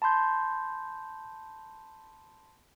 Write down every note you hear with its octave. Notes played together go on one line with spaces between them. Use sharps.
A5 B5 C6 G6